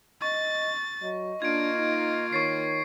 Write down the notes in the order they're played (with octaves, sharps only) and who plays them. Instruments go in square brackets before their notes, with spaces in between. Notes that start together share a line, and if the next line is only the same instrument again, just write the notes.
[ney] D#5 [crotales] C#6 [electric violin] A6
[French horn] F#3 [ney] D#5
[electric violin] A#3 F4 [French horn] D4 [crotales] G#6 D7
[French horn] D#4
[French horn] D#3 [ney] C#5 [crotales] C#6 A6 C7